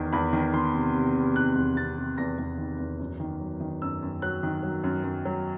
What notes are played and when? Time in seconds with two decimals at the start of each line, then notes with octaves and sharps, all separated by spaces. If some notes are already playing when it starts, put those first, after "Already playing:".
Already playing: E2 D#3
0.13 E2 B5
0.33 D#3
0.53 D#3 C6
0.74 C3
0.94 C3
1.15 C3
1.35 D#3 F#6
1.55 E2
1.77 C3 A6
1.97 C3
2.18 E2 A#6
2.39 E2
2.58 D#3
2.79 E2
3.00 F#2
3.20 D#3
3.40 F#3
3.60 D#3
3.82 F#2 E6
4.03 F#2
4.22 F#3 F#6
4.43 D#3
4.63 F#3
4.84 F#2
5.04 F#2
5.25 F#3